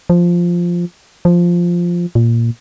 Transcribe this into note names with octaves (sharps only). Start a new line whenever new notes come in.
F3
F3
A#2